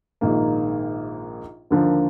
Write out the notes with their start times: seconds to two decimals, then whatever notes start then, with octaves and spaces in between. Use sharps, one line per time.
0.21 A#1 G#2 D#3 A#3
1.70 D#2 D3 F3 A#3